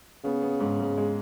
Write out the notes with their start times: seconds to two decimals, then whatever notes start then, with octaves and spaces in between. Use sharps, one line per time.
0.24 C#3 B3
0.42 B3
0.60 G#2
0.79 G#2
0.98 G#3